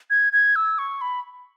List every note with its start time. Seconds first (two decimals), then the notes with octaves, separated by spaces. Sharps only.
0.10 G#6
0.33 G#6
0.56 E6
0.78 C#6
1.01 B5